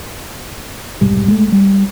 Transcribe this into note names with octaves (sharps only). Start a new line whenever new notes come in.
F1 B1 G#2 G3
G#3 A3
G3